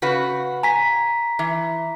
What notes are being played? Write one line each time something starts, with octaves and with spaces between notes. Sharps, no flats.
C#3 F#4 B4
G#5 A#5 B6
E3